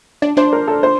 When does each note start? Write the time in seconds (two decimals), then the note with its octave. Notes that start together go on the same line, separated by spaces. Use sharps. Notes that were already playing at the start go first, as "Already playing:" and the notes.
0.22 D4 D5
0.37 D4 C5
0.53 A#4
0.68 A4
0.83 C5